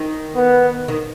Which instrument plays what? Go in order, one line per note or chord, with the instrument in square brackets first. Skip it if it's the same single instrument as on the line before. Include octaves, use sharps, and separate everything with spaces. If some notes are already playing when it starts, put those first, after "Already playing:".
Already playing: [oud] D#3
[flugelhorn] B3
[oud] D#3